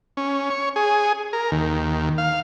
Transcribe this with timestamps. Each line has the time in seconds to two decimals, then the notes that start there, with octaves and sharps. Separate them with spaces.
0.17 C#4
0.50 C#5
0.76 G#4
1.33 A#4
1.52 D#2
2.18 F5